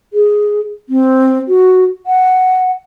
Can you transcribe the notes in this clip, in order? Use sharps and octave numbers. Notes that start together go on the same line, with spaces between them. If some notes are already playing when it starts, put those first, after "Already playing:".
G#4
C4
F#4
F#5